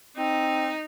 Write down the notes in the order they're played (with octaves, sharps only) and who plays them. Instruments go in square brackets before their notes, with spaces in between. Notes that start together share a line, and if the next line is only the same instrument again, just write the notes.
[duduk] C4 [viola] D#4